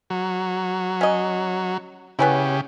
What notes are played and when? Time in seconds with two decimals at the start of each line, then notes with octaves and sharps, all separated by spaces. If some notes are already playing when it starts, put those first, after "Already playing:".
0.10 F#3
1.01 C#4 D#5
2.19 C#3 B3 C#4 E4 G4